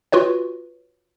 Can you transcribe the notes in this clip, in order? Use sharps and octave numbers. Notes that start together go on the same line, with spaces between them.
F4 F#4 B4 C#5